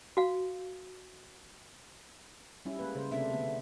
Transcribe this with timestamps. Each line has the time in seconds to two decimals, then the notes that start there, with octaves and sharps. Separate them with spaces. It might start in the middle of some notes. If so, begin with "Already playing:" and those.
0.17 F#4 F5
2.65 G3 C#4 E4
2.79 G#3 A#3 B4
2.95 C#3 C5
3.11 C3 A3 D4 E5
3.30 D3 A3 B3